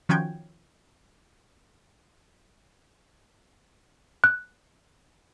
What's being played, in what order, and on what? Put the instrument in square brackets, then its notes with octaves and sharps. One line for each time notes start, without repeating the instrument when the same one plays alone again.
[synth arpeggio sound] D#3 F3 C#4 F#4 G5 G#6
[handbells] F#6